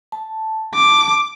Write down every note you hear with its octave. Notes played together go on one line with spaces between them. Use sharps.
A5
D6